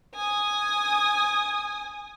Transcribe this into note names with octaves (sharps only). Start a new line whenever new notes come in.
G#5 D#6